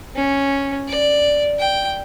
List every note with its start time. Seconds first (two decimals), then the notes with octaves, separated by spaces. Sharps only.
0.16 C#4
0.88 D5
1.59 G5